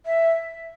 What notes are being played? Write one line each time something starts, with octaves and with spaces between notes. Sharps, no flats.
E5